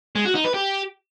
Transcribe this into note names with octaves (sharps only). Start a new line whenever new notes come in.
G#3
F#4
D#4
B4
G4